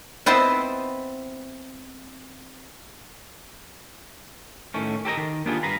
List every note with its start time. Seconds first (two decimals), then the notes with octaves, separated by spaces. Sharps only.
0.26 B3 C4 E4 C5 D#5 A5
4.74 A2 D#3 A3 C#4
5.05 G4 A4 A#4 C5 D#5
5.17 D#3
5.46 A#3 B3 D4 F4 G4 G#4
5.63 G2 B4 F5 A#5 B5